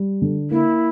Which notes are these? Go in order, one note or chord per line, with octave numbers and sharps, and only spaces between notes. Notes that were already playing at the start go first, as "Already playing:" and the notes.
Already playing: G3
D3
A#3 E4